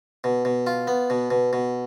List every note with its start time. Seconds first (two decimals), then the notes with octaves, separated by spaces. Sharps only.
0.24 B2
0.45 B2
0.67 F4
0.87 B3
1.10 B2
1.31 B2
1.53 B2